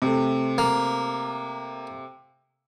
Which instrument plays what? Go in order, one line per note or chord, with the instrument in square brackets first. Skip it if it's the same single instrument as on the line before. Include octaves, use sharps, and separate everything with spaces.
[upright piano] C3 A3
[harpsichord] A#3